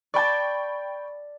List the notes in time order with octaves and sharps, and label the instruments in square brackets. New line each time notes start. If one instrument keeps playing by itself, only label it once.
[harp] D5 A5 [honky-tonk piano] G5 B5 C#6